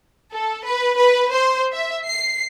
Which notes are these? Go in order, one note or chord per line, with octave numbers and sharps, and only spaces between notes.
A4
B4
B4
C5
E5
C7